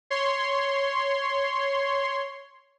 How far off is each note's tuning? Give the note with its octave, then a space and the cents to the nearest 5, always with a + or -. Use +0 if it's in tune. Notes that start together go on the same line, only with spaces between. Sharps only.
C#5 +0 C6 +0